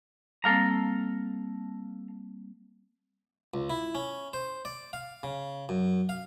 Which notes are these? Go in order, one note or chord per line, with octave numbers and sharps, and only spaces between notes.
G3 A#3 C4 A4 F5 A#5
C#2
E4
C#4
C5
D5
F5
C#3
F#2
F5